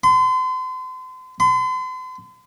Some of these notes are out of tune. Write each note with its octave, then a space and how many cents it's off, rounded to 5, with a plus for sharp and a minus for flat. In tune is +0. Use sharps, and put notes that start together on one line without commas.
C6 -40
C6 -45